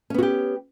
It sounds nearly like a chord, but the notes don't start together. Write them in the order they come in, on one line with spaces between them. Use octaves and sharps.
C#4 B3 F#4 G4